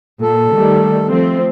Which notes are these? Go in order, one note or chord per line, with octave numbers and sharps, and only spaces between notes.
A#2 A4
D#3 G3 A3
F3 A3 C4